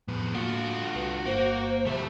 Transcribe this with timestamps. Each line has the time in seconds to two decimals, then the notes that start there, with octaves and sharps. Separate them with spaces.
0.08 F2 A2 B3
0.35 A2 D3 A3 A#3 F4 F#4
0.94 C2 B4
1.26 G1 A#3 C5
1.86 D2 G3 A3 E5